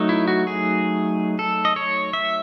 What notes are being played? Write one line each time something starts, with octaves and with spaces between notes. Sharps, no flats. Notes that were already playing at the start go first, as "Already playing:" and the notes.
Already playing: F#3 A3 D#4
E4
F#4
G#4
A4
D#5
C#5
E5